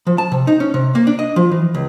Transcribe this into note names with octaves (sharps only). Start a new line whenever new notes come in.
F3
A5
C3
D#4
C#4
C3
A#3
D4
D#5
F3
E3
C#2